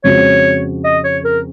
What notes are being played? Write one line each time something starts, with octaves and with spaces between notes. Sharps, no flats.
F2 C#3 G#3 C4 F#4 C#5
D#5
C#5
A#4